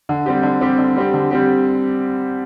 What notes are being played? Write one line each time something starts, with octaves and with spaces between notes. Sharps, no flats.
D3
G3 C4 G4
D3
G3 C4 G4
D3
G3 C4 G4
D3
G3 C4 G4